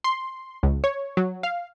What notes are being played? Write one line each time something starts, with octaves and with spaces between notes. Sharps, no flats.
C6
C#2
C#5
F#3
F5